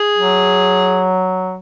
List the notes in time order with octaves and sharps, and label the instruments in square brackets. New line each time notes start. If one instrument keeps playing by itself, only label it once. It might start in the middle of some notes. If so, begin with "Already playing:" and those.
Already playing: [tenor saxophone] G#4
[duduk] F#3